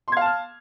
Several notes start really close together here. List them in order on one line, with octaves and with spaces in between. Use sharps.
C6 G#6 F5 A5 F6